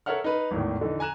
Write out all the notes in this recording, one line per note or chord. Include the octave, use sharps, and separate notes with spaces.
A4 A#4 C#5 E5 F#5 F6
D#4 B4
G#1 E2 A2 D#3
D3 E3 D#4
G#5 A#5 F#6 E7